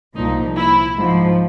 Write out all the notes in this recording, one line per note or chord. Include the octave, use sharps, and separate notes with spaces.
C2 A#2 F3 D#4
E4
G#2 F3